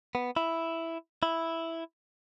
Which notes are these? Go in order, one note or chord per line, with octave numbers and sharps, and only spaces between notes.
B3
E4
E4